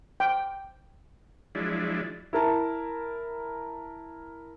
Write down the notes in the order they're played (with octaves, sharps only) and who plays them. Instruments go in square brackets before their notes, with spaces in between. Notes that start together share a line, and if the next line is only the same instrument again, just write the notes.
[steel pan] G5
[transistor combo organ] F3 F#3 G#3 D4 E4
[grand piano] E4 A#4 A5